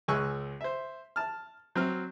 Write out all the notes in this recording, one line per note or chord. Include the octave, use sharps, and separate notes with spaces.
C#2 G#3 G#5 C#6 E6 F#6
C5 E5
A5 F6
F#3 C4 F6